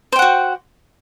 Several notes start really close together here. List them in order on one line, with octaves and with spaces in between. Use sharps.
C5 G5 F#5 F#4